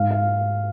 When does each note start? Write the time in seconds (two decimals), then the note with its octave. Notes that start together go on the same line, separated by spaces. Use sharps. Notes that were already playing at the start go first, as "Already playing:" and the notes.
Already playing: G#2 F5
0.11 F5